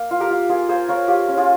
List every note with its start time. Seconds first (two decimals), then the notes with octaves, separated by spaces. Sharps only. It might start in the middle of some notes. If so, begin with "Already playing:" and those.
Already playing: A#3
0.11 F4
0.20 G4 A#4
0.31 F4
0.49 A#3 F4 G#4
0.69 A#3 G#4 C5
0.88 F4 A#4 C#5
1.08 F4 G4
1.28 C#4
1.37 F4 G#4